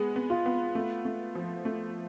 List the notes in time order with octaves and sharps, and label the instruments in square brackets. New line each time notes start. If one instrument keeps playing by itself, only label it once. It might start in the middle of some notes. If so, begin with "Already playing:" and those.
Already playing: [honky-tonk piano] G#3 B3 [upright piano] G#4
[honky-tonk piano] B3
[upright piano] F4
[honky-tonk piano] B3
A3
A3
F3
A3